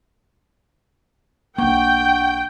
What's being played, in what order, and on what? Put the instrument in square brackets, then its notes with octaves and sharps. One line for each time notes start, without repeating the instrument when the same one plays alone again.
[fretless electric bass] B1 A#3 [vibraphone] D4 F#5 C#6 [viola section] G5